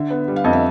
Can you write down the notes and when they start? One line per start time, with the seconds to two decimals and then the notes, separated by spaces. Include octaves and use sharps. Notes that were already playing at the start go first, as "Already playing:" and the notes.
Already playing: D3 E5
0.10 B3
0.28 G3
0.36 F5
0.44 F2 D#5
0.53 E5